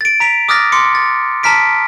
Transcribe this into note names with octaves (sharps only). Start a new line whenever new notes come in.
A6 D7
A#5 B6 D7 F7
D6 D#6 F6 F#6 A6 A#6
C6 D6 C#7
A6
A5 A#5 F6 B6 D7